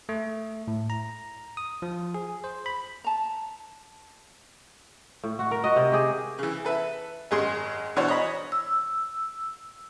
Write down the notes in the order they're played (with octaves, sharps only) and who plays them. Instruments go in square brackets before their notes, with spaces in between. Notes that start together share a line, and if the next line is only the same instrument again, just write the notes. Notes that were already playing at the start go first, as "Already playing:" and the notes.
[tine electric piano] A3
A2
A#5
D#6
F3
G#4
C5
B5
[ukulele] A5 A#5
[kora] A2
F#4
A#4
F#4 D#5
C3
G4 G#4
[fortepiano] C#3 E3
A4 B4 E5
G#1 F#2 G#3 G#4 C6
B2 E3 D4 F#4 C5 C#5
C#5 D#5 B5
[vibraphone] E6